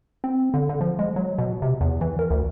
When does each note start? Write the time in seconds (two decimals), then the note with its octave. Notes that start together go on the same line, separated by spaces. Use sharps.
0.24 C4
0.54 D3
0.69 D3
0.81 F3
0.99 G#3
1.16 F#3
1.38 B2
1.62 C3
1.81 E2
2.01 E3
2.19 A#4
2.31 D2